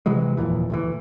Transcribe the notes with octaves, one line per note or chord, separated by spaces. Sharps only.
C3 E3 F#3 G#3
D#1 F2 A#2 E3
D2 A2 E3